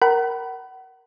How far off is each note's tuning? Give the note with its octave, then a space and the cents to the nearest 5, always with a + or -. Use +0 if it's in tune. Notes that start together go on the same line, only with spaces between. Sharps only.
A#4 +0 F#5 +35 B5 +5